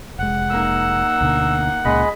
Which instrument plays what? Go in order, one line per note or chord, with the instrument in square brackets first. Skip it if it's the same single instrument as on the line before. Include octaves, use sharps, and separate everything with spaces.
[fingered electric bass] F1 G#3 [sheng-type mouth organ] F#5
[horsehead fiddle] A#3 D#4 [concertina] E6
[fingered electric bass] D2 B2 D3
[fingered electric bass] C#2 A#2 C#3 [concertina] G#3 D#5 B5